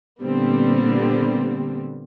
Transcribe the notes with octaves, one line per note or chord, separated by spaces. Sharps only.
A#2 D3 G3 B3 C4